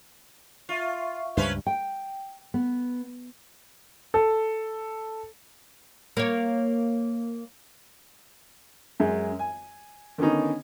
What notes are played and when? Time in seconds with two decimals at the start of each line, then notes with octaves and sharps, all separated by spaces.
0.69 F4 E5 F5 C#6
1.37 C#2 G2 G3 C#4 B4 C5
1.66 G5
2.54 B3
4.14 A4
6.17 A#3 C#5
9.00 F#2 G#3
9.39 G#5
10.18 D3 D#3 B3 C#4 D#4